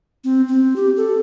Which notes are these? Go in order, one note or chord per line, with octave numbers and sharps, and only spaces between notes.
C4
C4
G4
A4